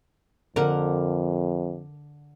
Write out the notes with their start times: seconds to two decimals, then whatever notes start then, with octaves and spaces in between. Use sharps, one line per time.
0.56 F2 D3 A#4 F#5